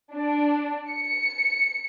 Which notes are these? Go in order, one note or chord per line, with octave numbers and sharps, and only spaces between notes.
D4
C#7